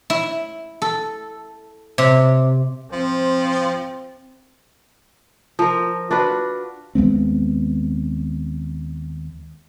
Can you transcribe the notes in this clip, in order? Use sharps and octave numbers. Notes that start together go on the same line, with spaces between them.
E4
A4
C3
F3 C4
F3 A#4
D4 F4 F#4 B4
D#2 G#3 B3 C4